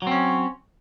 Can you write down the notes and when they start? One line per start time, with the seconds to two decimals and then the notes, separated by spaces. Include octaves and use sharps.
0.02 F#3
0.07 C4
0.12 C#4